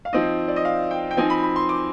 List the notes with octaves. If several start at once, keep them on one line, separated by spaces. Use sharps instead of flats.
F5
F3 C4 D#4 D#5
D5
D#5
F5
G5
G5
F3 C4 D#4 G#5
B5
B5
C6
D6